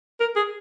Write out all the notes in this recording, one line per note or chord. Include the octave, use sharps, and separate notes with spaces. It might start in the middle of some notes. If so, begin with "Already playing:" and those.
A#4
G#4